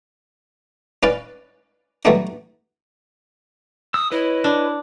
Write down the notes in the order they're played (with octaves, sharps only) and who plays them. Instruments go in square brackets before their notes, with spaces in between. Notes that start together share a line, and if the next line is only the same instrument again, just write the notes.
[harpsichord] C#4 B4 D5 F5
F#3 G3 A3 B3 D4
[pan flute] D#6 [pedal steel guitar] E6
[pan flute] E4 [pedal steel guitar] B4 C#5 D#5
[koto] D4